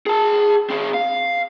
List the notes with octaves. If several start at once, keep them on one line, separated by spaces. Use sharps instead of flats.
G#4 A5
C4 G#4
F5